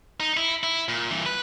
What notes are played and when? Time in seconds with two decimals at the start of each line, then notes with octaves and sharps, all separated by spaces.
0.20 D#4
0.37 E4
0.63 E4
0.88 A#2
1.11 G2 E3
1.26 B4